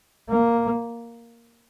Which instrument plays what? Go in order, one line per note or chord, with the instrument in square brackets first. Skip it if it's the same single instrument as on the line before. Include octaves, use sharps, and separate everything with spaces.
[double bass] A#3